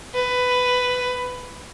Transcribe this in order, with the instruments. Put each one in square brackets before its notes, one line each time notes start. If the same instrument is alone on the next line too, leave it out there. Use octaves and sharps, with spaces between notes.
[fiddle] B4